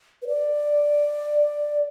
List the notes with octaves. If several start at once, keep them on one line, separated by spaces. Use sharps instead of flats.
B4
D5